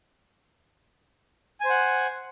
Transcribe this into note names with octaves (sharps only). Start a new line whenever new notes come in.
C5 F#5 G#5